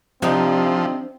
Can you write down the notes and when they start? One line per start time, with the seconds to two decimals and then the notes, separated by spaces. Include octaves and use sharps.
0.22 C3 F3 C4 D4 D#4